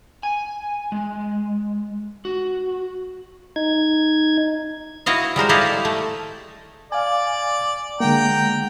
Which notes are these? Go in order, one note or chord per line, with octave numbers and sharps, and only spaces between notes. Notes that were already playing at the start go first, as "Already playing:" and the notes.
G#5
G#3
F#4
D#4 G#6
E4 F#4 D#5 F5
G3 G#3 A#4 C5
E4 G4 A4 D5 D#5 F5
A3
D5 F5 G#5
D3 G#3 A#3 F#5 G5 A#5